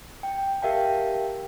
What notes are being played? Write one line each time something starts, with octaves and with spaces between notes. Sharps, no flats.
G5
G4 A#4 E5 F5 G5 A5